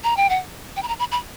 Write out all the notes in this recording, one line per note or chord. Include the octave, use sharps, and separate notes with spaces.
A#5
G5
F#5
G5
B5
A#5
B5
B5